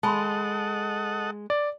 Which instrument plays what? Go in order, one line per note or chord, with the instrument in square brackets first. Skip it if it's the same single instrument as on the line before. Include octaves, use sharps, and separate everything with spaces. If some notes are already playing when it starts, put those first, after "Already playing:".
[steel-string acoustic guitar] G#3 [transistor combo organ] A4 D#5 F#5 [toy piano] A5 B5 C6
[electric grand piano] D5